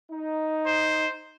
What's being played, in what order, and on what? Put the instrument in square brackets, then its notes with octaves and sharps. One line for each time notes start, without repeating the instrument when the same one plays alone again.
[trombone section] D#4
[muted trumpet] C5